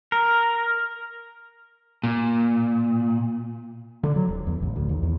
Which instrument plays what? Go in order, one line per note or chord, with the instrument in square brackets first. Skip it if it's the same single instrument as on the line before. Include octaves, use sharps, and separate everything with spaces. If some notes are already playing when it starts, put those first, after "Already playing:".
[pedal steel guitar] A#4
[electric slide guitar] A#2
[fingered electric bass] D3
F#3
D#1
E2
A1
D2
D#2
E2